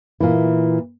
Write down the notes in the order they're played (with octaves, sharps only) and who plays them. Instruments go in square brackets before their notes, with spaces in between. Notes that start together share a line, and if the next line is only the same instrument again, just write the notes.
[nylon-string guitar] A#2 E3